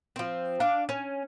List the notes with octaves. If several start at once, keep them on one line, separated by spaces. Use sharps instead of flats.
F3 C4
D4 F5
C#4